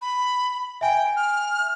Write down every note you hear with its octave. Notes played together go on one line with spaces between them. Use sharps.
B5
E5 G5 G#5
F6